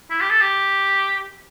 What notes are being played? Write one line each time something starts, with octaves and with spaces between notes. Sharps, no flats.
E4
G4
A4
G4